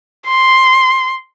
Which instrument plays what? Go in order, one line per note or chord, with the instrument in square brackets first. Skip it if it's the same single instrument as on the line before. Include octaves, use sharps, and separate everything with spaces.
[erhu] C6